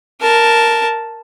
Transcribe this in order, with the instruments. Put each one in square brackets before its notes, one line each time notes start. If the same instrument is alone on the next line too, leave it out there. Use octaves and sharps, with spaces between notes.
[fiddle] A#4 A5